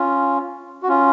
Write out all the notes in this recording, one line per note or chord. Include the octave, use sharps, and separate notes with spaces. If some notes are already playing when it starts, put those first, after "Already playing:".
Already playing: C#4 F4
F#4
C#4 F4